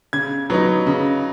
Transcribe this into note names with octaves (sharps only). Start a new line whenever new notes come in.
C#3 G#6
F#3 B3 D#4
C#3